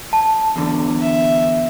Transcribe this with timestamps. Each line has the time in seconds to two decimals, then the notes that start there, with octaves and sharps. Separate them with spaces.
0.13 A5
0.56 E2 D3
1.02 E5